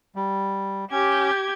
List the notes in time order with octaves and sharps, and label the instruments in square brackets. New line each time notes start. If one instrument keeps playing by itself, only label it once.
[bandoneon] G3
[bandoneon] C#4 [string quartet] G4 G#6